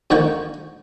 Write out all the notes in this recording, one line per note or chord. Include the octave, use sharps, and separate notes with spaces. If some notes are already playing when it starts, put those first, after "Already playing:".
F2 D3 D#3 G5 C#6